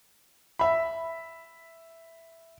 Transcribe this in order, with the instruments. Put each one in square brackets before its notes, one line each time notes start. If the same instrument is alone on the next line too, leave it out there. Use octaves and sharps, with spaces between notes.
[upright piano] E5 B5